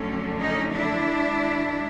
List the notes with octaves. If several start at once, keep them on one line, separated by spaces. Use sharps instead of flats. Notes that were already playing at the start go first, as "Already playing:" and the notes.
Already playing: F2 D3 F#3 A3 C#4
C#4 D#4
D4 E4
F#2 D#3 G#3